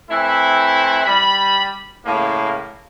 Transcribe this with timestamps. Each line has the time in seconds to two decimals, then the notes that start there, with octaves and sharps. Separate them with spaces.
0.10 E3 A3 C4 E4
1.05 G3 B5
2.06 A2 C#3 A#3